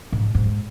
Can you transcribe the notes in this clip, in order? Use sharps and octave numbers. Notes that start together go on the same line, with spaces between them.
G#2
G#2